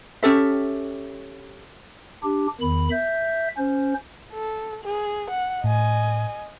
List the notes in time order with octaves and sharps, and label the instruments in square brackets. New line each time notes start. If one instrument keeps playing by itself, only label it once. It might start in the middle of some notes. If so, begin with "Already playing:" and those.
[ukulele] C#4 G4 A4 E5
[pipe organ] D4 G4
E2 D#3 B5
E5 G6
C#4 C5
[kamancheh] A4
G#4
F#5
[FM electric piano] A2 [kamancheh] D#5 G#5